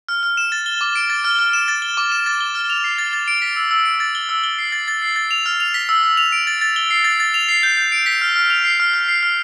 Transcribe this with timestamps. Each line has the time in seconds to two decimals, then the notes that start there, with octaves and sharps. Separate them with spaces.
0.09 F6
0.23 F6
0.37 E7
0.52 A6
0.66 G7
0.81 D6
0.96 D7
1.10 A6
1.25 F6
1.39 F6
1.53 E7
1.68 A6
1.82 G7
1.97 D6
2.12 E7
2.26 A6
2.41 G7
2.55 F6
2.70 F7
2.84 C7
2.98 A6
3.13 A6
3.28 D7
3.42 B6
3.56 E6
3.71 E6
3.86 D7
4.00 A6
4.15 G7
4.29 E6
4.44 G7
4.58 C7
4.72 A6
4.88 A6
5.02 C7
5.16 A6
5.31 F7
5.46 F6
5.60 F7
5.74 B6
5.89 E6
6.03 E6
6.17 F7
6.32 D7
6.47 A6
6.61 A6
6.76 G7
6.91 C7
7.04 A6
7.20 A6
7.34 F7
7.49 C7
7.63 G6
7.77 G6
7.92 D7
8.06 B6
8.21 F6
8.36 F6
8.50 F7
8.64 C7
8.80 F6
8.94 F6
9.08 C7
9.23 F6